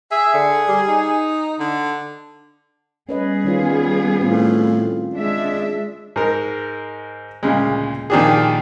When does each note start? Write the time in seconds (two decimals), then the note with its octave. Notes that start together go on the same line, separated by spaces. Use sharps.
0.12 G#4 E5
0.34 D3
0.68 G3
0.88 D#4
1.60 D3
3.09 G3 B3 C#4 G#4 B4 D#5
3.45 D#3 C#4 F4
4.21 A2 C4 F4
5.14 G#3 D4 E5
6.16 G#2 A#4
7.43 D2 A#2 C#3 G#3
8.10 A#2 D#3 F3 D4 G4 G#4